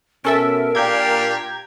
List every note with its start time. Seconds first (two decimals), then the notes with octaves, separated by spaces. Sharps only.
0.25 B2 C#4 A4 A#4 E5
0.75 A#2 D4 G4 F5 G5 A#5 G#6